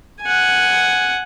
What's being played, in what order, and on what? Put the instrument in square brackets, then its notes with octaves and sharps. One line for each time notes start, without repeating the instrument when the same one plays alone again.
[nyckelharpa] F#5 G#5